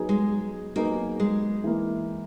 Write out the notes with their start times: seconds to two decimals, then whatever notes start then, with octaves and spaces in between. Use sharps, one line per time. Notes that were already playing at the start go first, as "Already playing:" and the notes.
Already playing: F#3 B3 D#4 G#4
0.09 G#3
0.76 F#3 A#3 B3 D#4 G#4
1.20 G#3
1.64 E3 A#3 E4